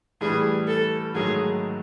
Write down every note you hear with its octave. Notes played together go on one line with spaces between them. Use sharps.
A2 E3 G3 G#4
A4
G#2 D#3 F#3 A3 G#4